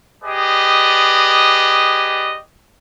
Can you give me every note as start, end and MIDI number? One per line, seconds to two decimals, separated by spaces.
0.23 2.36 67
0.23 2.36 68
0.23 2.36 71
0.23 2.36 74
0.23 2.36 75